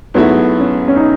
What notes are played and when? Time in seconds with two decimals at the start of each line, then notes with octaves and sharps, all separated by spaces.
0.14 G#2 F#3 A3 B3 E4
0.60 C#4
0.88 C#4
0.96 D#4